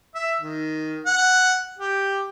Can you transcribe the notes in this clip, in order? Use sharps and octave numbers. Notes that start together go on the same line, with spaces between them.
E5
D#3
F#5
G4